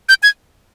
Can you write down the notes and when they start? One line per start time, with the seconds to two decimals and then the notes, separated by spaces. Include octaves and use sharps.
0.09 G6
0.23 G#6